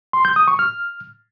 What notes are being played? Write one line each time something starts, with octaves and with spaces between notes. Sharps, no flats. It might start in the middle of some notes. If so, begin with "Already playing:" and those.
C6
G6
D#6
C#6
F6